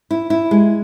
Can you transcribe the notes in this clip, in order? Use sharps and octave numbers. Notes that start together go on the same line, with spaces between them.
E4
E4
G#3